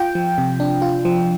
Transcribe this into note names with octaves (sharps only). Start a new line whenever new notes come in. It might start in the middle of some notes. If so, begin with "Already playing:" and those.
Already playing: F4 G5
F3
C3
D4
F4
F3